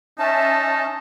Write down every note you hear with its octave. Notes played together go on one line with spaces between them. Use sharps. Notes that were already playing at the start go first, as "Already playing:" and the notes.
C#4 D#4 E5 A5